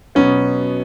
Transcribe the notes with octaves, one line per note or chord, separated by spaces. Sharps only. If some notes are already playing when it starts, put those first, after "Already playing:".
B2 F#3 B3 C#4